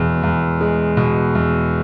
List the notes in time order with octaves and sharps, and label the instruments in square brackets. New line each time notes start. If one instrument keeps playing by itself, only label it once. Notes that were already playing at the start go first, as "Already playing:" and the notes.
Already playing: [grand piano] E2 B2 G#3
E2
G#3
B2
E2